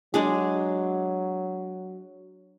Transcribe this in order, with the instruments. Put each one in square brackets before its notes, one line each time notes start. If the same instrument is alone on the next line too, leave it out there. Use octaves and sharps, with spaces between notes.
[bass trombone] F#3 [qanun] G#3 D4 G#4